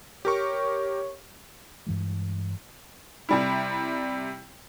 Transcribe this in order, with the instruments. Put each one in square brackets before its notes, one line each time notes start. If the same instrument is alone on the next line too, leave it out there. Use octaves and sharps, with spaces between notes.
[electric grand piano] G4 A#4 C#6 [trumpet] C#5
[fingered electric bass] G2 E3 G#3
[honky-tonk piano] C3 G3 E4